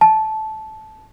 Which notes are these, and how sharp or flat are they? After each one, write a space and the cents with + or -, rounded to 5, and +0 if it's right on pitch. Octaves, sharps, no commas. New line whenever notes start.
A5 -15